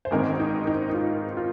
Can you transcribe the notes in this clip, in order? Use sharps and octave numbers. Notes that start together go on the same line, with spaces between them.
C5
G#1 G#2 D#3 C4 A#4
D#4
D#4
D#4
F4
F4